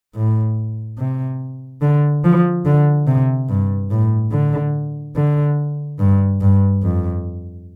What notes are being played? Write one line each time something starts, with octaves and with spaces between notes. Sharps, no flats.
A2
C3
D3
F3
D3
C3
G2
A2
D3
D3
G2
G2
F2